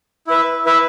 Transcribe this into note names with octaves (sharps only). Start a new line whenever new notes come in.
E4 B4 E5
E4 B4 E5